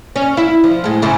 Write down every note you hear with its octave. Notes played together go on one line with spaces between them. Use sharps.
C#4
E4
F3
A2 G#3
G#2 C#3 E4